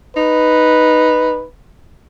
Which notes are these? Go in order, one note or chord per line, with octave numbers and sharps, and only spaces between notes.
D#4 B4